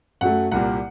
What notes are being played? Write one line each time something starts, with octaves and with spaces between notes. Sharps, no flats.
F#2 F#3 A3 F#5
C2 A#2 G3 A#3 F#5